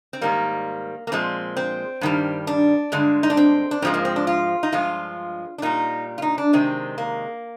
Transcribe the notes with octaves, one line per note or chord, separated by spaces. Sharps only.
C4
G#2 D#3 G3 A#3
A#3
A#2 F3 G#3 C4
C4
G2 D#3 G3
D4
G2 D3 G#3
D#4
D4
C4
D4
G#2 F3 G#3 C4
A#3
C4
D4
F4
D#4
G2 F3 G#3 F4
D4
A#2 G3 D#4
F4
D#4
D4
C3 D#3 G#3 C4
A#3